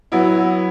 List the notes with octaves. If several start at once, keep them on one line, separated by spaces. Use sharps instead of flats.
F#3 B3 E4